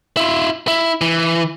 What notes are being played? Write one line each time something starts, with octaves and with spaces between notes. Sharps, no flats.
E4 F4
E4
E3